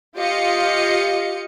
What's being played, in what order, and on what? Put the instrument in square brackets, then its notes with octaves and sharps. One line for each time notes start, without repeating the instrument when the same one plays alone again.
[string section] F4 G4 D#5 F5 C#7